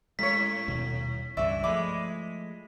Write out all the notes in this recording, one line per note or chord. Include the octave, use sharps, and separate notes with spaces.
A2 G#3 C#5 B6
D#1 B2
C#2 G2 E3 D5 E5 C#6
F3 G#3 A3 E4 B5 D6